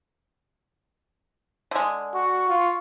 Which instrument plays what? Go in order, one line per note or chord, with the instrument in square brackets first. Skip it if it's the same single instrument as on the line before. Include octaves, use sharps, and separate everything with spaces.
[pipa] D3 G#3
[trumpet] F#4 [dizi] C#6
[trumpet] F4